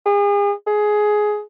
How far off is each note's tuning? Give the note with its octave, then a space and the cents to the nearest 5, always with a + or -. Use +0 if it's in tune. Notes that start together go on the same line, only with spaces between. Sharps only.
G#4 -40
G#4 +15